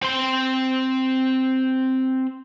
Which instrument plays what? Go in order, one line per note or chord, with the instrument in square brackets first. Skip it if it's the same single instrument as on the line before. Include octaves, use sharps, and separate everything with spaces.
[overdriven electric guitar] C4 C6